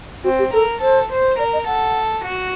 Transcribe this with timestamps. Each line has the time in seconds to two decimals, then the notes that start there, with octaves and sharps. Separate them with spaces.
0.24 C4 F#4
0.39 G4
0.53 A4 A#4
0.81 A4 C5
1.10 C5
1.38 A#4 D5
1.53 D#5
1.66 A4 F#5
2.23 F#4